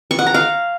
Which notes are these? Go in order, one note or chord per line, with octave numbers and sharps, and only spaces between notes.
C#6
F#5
A#5
F5